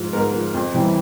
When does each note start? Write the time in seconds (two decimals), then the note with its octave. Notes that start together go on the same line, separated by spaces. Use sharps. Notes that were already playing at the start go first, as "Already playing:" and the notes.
Already playing: G#2 F3
0.13 G#2 A#4
0.27 A#4
0.33 F3
0.54 F2
0.74 C3 E3 G3